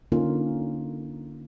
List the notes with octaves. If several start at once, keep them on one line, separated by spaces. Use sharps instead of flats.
D3 A#3 C#4 D#4 F4